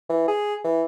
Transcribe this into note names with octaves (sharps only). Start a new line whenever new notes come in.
E3
G#4
E3